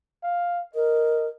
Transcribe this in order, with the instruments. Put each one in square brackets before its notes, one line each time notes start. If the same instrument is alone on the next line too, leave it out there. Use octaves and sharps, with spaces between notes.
[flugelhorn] F5
[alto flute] A#4 [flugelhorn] D#5